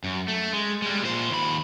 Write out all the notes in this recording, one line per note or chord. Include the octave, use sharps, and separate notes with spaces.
F#2
A3
G#3
G3 G#3
A#2 C5
D#2 B5